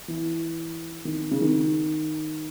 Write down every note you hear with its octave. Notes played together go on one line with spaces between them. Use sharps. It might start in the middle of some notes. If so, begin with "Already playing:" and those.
E3
D#3
C#3
D#3